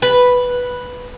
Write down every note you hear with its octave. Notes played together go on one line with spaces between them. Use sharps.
B4